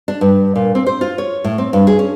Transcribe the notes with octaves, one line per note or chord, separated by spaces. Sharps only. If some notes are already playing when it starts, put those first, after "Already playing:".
D4
G2
A#2
C4
C5
F4
C#5
A2
C4
G2
G#4
C#4